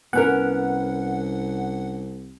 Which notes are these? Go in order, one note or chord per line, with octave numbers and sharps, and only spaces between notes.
C2 B3 C#4 A#4 F#5